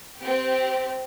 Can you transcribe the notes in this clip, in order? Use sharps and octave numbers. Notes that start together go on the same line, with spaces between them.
C4 G4